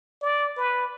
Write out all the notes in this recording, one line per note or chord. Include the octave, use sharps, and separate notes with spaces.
D5
B4